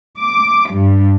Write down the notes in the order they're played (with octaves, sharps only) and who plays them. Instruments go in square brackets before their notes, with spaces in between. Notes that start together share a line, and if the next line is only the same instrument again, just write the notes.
[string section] D6
G2